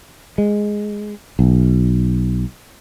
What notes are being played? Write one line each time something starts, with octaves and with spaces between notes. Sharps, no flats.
G#3
B1